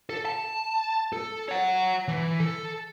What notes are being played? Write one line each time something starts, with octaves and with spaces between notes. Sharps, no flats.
A4
A5
A4
C#5 F#5
E3
A4